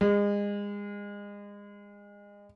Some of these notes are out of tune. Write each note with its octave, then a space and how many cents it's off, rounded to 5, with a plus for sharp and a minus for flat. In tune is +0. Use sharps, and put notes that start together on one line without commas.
G#3 -30